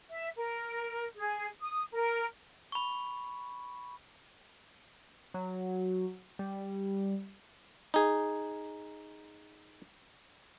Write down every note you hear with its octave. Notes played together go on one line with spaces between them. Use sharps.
E5
A#4
G#4
D#6
A#4
B5 C#6
F#3
G3
D#4 G#4